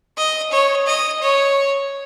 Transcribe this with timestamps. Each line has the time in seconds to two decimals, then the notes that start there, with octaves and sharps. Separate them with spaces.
0.17 D#5
0.51 C#5
0.86 D#5
1.21 C#5